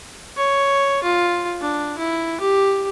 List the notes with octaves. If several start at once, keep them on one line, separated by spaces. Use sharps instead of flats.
C#5
F4
D4
E4
G4